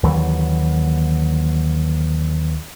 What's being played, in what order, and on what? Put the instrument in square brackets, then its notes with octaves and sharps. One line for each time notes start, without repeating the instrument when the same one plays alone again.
[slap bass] D#2 D3 E3 F#3